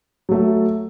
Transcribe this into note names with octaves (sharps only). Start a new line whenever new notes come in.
F#3 A3